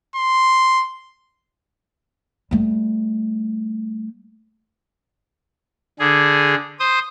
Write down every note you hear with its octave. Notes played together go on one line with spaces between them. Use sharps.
C6
G3 A3
D3 G#4
C5 D#6